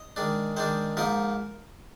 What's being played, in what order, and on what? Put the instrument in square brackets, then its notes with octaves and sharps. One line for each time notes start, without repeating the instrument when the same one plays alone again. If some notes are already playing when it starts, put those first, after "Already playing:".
Already playing: [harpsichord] D#5
D#3 G#3 D4
D#3 G#3 D4 C5
G#2 F3 A#3 D#4 A#4